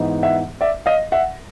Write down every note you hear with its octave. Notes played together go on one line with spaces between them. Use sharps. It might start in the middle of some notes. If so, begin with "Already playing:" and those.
Already playing: G#2 E3 G#3 B3 D#4
E5 F#5
D5 E5
D#5 F5
E5 F#5